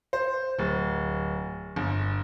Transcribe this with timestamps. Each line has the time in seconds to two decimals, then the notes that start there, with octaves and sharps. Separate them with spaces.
0.13 C5
0.59 D1
1.76 G1